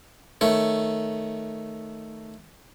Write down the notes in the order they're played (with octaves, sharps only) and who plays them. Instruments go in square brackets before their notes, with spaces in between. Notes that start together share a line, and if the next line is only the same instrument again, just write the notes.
[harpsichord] D#3 A3 C#5